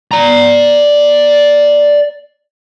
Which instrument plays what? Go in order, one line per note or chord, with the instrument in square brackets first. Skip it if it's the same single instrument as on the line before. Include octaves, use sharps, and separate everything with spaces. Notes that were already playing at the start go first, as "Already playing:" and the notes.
[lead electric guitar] D5 A#5